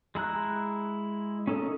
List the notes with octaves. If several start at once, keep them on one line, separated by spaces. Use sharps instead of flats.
G#3 E4 A#5 F#6
C#4 D#4 A4 A#4 D#5